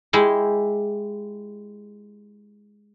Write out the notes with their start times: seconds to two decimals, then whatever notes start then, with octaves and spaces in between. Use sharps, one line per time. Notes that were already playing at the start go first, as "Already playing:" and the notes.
0.13 G#3 E4 G4